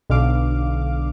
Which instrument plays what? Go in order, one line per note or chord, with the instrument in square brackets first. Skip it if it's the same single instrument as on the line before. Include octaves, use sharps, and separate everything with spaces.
[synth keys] B1 B2 D3 F5 D6